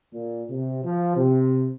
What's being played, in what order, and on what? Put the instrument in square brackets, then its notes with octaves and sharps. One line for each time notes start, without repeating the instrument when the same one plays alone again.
[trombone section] A#2
C3
F3
C3